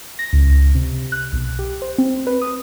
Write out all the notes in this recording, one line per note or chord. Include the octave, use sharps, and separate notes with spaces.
A#6
C#2
C3
F#6
B1
G4
C5
C4
B4
D#6